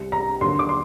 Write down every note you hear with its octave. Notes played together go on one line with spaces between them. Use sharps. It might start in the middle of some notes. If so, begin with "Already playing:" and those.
Already playing: C2 C3 G3
A#5
D#2 D3 F#3 A#3 C6
D6
C6